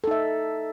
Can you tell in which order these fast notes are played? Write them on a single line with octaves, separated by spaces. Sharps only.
A4 D#4 E5